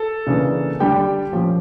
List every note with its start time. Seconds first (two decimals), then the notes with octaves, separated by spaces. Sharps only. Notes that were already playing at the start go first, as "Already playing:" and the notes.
Already playing: A4
0.27 C#3 E3 A#3 D4
0.80 D3 G3 D4 G4 G5
1.33 A#2 F3 C#4